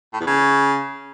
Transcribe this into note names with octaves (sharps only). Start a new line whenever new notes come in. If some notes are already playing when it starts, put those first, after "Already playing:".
A2
E2
C#3